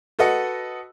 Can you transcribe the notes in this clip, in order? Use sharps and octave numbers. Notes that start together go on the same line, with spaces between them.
F#4 A4 B4 D#5 F#5